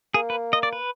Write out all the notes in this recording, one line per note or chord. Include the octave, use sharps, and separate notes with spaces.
A#3 G#4
B4
D#5
D5
B4